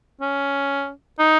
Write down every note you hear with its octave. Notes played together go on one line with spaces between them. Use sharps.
C#4
D#4